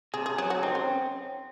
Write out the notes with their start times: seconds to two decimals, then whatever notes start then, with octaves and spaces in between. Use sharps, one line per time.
0.14 C3 G#4
0.26 G#4
0.38 F#3 G#4
0.50 F#4
0.63 C4 D#4
0.75 C#4